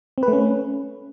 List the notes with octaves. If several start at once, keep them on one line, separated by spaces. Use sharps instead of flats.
C4
B4
A3
C#4